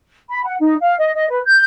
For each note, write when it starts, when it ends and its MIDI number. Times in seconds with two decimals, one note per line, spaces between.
0.29 0.43 83
0.45 0.55 78
0.59 0.74 63
0.80 0.94 77
0.98 1.11 75
1.13 1.26 75
1.29 1.40 71
1.45 1.64 91